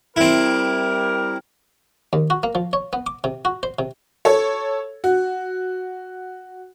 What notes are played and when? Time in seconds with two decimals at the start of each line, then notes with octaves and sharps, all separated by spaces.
0.16 G3 C4 E4 A#4
2.13 D#2
2.30 F#4
2.43 A#3
2.55 F3
2.73 C#5
2.93 B3
3.06 D6
3.24 C3
3.45 F#4
3.63 C5
3.79 C3
4.25 A4 C#5
5.04 F#4